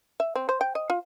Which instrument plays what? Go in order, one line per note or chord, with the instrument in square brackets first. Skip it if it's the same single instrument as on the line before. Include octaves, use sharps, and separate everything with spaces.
[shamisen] E5
C4
C5
G5
D#5
F4